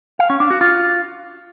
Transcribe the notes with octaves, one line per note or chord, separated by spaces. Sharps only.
F5
C#4
D4
F#4
F4